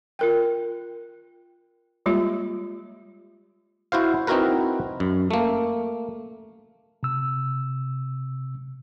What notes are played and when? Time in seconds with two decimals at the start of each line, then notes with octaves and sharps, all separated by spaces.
0.19 F4 A#4 G5
2.06 G3 G#3 A#3 F4 G4
3.92 E4 F#4 C5 F5
4.27 C4 D#4 E4 F#4 A#4 B4
5.00 F#2
5.31 A3 A#3
7.03 C3 E6